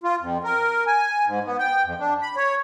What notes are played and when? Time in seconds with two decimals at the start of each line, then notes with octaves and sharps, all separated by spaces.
0.04 F4
0.20 F2
0.44 A#4
0.87 G#5
1.25 G#2
1.45 B3
1.59 G5
1.84 F2
1.99 D4
2.22 B5
2.36 C#5